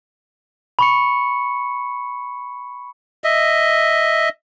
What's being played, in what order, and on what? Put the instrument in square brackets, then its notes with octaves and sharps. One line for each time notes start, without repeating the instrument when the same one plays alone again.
[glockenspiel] B5 C#6 C#7
[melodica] D#5 E5